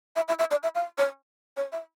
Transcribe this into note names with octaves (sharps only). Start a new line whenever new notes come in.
E5
E5
E5
D5
E5
F5
C#5
C#5
E5